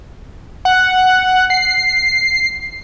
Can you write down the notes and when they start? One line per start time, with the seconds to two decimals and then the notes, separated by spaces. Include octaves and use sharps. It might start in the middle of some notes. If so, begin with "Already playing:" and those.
0.65 F#5
1.50 C7